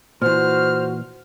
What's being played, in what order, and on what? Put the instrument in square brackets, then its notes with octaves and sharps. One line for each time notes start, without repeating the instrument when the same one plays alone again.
[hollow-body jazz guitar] A#2 E3 [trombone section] F#4 [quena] C5 [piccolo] F6